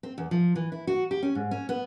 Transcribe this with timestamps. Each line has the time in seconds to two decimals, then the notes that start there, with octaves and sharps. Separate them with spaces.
0.03 C4
0.18 E2
0.31 F3
0.55 E3
0.72 E4
0.87 F#4
1.11 G4
1.23 C#4
1.35 G#2
1.51 C#4
1.69 B3